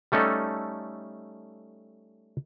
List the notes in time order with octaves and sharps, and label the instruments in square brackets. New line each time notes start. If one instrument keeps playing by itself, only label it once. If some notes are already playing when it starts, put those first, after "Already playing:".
[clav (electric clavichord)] G3 A3 C#4 D#4 G4 A4